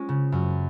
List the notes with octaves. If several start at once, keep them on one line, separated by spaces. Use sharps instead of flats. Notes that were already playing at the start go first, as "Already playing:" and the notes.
Already playing: G#3 C#4 F4
C#3
F#2